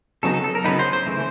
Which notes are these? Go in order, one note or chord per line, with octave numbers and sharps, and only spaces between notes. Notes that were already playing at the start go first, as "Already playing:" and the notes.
C#3 F#3 B3 D#4 A4
A4
A4
A#4
C#3 F#3 B3 D#4 B4
C5
C5
C#3 E3 A3